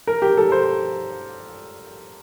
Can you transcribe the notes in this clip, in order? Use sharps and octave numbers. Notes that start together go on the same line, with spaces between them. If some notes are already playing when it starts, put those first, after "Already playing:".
A#4
G4
A4
C5